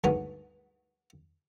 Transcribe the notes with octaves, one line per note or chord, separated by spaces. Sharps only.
D2 G2 G#3 B3 D#4 C#5